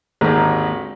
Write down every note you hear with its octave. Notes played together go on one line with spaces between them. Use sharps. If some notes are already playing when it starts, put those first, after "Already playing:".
G#1 D#2 G#2 D3 G#3 A#5